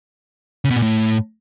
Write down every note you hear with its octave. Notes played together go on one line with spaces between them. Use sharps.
C#3
B2
A#2
A2